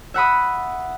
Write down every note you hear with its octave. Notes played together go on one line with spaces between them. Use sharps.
E5 F#5 B5 D#6